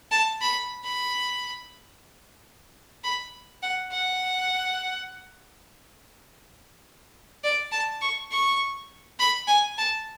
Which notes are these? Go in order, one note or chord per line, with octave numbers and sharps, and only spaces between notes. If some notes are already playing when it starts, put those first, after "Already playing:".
A5
B5
B5
B5
F#5
F#5
D5
A5
C#6
C#6
B5
G#5
A5